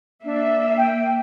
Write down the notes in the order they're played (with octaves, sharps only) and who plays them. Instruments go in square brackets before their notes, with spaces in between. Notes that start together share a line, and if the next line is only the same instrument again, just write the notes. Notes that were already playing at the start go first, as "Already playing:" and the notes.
[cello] A#3 [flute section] D4 [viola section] E5
[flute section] G5